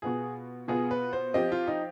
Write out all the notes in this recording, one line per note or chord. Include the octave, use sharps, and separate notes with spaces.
B2 B3 F4 G#4
B2 B3 F4 G#4
B4
C5
F3 C4 G4 D#5
F4
D#4